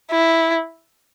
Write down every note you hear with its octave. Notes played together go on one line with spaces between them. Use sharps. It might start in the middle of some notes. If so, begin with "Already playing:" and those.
E4